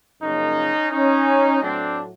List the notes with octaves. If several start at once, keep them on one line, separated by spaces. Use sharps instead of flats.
F#2 C#3 F3 A#3 C#4 D#4
C#4 D#4
A2 F#3 A3 C4 D4